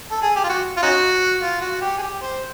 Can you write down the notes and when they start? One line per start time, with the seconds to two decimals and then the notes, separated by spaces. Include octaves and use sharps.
0.11 A4
0.22 G#4
0.36 G4
0.44 F4
0.49 F#4
0.77 F4
0.82 C#4 D#4 F#4
1.42 F4
1.61 F#4
1.82 G4
1.98 G#4
2.02 G4
2.21 C5